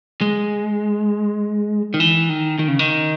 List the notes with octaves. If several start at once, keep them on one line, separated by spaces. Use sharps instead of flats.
G#3
D#3
E3
D#3
D#3
C#3
D#3